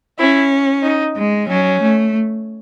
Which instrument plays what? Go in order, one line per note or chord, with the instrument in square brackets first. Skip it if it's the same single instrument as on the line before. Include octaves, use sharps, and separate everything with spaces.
[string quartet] C#4 [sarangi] E4
[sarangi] D#4
[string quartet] G#3
[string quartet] F#3 [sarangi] C#4
[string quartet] A3